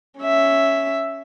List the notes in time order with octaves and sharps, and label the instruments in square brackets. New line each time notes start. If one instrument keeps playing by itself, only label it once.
[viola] C#4 E5